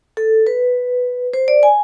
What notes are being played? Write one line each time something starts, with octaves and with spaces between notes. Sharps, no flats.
A4
B4
C5
D5
G#5